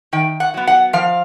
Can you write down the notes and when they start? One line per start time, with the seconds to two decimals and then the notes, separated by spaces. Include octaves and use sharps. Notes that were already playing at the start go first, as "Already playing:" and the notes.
0.13 D#3 G5
0.40 F#5
0.54 F#3 B3
0.67 F#5
0.93 F3 F5